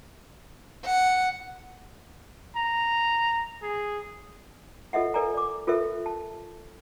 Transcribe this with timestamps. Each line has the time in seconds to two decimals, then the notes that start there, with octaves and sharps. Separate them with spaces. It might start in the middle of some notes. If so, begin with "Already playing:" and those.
0.85 F#5
2.56 A#5
3.63 G#4
4.93 F4 A4 D#5 E5 F#5
5.14 A4 A#4 D5 G#5 A#5
5.34 D5 D6
5.67 F4 A4 A#4 C5 E5
6.06 A5